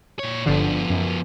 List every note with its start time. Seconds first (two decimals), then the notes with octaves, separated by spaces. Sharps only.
0.19 A#2 C#5
0.46 G1 D3 F3 B3
0.90 F#2